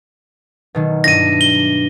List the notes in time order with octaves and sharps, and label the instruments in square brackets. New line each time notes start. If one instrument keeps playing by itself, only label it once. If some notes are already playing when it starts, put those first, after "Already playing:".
[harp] B2 D#3 F#3
[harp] G2 D4 E4 [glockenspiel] A#6 D#7
[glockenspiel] G7